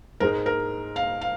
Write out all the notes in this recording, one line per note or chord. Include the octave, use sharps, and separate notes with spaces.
G#2 G#3 D#4 A#4
A#4
F5
F5